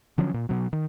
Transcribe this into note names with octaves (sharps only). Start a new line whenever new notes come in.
D3 F3 F#3 C#4
A#2
B2 F#3
D#3